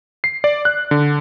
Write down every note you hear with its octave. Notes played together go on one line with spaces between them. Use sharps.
C7
D5
F#6
D3